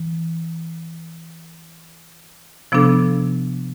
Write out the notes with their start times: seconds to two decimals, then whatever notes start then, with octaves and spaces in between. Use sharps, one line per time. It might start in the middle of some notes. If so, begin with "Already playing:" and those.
Already playing: E3
2.72 C3 F3 B3 D4 A4